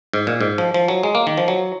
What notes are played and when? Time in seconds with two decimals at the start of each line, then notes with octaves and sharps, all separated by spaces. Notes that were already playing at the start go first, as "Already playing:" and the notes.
0.14 G#2
0.27 A#2
0.41 G#2
0.58 F3
0.74 F3
0.88 F#3
1.03 G#3
1.15 A#3
1.27 D#3
1.37 F3
1.48 F#3